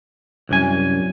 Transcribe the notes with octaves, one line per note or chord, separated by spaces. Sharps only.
C2 F#2 G#5